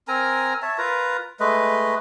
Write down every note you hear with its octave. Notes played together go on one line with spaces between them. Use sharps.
C4 A#4 G#5 A#5
C#5 E5 A5
F4 A#4 B4 A#5
G#3 A3 B4 D#5